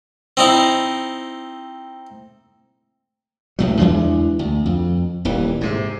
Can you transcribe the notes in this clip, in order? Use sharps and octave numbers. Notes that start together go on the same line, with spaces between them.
C4 D#4 E4
C#2 A2 F#3
E2 E3 G#3 D4
D2
F2
D#1 D#2 E3
G#2 C3